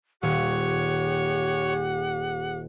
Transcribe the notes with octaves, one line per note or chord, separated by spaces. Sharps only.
D#1 G4 C#5 F#5